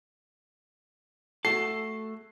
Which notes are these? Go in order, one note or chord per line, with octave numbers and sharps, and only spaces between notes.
A3 F#4 A4 C7